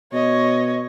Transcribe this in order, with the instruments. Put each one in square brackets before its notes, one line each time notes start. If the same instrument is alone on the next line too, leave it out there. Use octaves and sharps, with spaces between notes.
[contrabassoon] B2 [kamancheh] C#5 D#5